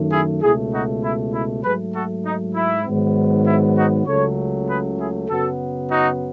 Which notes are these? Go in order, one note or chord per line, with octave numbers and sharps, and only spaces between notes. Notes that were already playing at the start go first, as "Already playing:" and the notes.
Already playing: F#2 D#3 A3
E4 G#4
C#2 B2 A3 E4 G#4
D#4 F#4
E4
E4
G#2 F#3 A3 G#4 B4
F#4 A4
D#4
E4
G#2 D#3 F#3 B3
E4
D#4 F#4
C#2 C#3 F#3 A3 A4 C#5
G#4 B4
E4 G#4
F#2 C#3 F#3 B3 F#4 A4
D#4 F#4